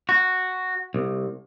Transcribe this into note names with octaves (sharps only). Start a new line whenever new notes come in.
F#4
C2